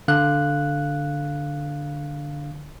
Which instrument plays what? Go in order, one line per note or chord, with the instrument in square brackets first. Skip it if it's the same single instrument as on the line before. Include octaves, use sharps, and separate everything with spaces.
[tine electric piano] D3 F5 F#6